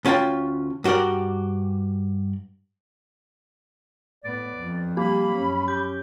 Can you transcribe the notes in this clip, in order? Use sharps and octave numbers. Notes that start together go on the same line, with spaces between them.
D2 C#4 F4 G5 A5
G2 F#4 G4 A#4 D5
A2 B3 D5
F2
G3 A#3 G4 B5
F#2 C#4
G4 G6